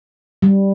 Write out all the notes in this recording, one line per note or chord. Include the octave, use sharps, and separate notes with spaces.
G3